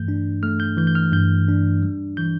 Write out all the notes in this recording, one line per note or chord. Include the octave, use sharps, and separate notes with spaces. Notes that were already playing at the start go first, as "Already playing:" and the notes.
Already playing: G2 E3 A3 G6
D4
A3 F6
G6
E3 G6
G6
F6
G2 G6
D4
G3
E3 G6